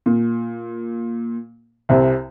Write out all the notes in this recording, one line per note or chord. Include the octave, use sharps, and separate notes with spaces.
A#2
C2 C3